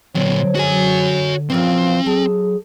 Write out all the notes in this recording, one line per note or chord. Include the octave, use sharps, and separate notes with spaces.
A#2 D3 F#3 C4 C#5
F#2 F#3 G#3 F#4 G#5
A#2 C#3 E3 F3 C4
F#3 G#4 A4